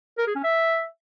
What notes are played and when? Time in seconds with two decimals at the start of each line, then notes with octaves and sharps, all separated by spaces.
0.18 A#4
0.27 G#4
0.35 C#4
0.44 E5